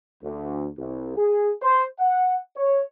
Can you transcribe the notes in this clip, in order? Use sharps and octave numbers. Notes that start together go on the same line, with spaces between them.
D2
C2
G#4
C5
F#5
C#5